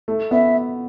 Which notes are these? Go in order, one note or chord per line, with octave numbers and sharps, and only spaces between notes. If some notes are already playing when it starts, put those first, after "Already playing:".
A3
B3 E5